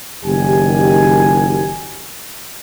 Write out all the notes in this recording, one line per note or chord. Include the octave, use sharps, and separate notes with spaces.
F#1 D#3 G4 G#5